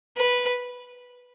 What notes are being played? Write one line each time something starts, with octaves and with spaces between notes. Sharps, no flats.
B4